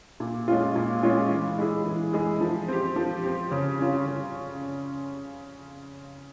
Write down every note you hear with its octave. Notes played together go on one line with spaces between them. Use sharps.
A#2
G#3 C#4 F4
A#2
G#3 C#4 F4
E3
G#3 E4 G#4
E3
G#3 E4 G#4
F3
C4 G4
F3
C4 G4
C#3
G3 C#4 F4
C#3